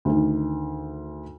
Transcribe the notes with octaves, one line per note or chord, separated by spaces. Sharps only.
D2 D#3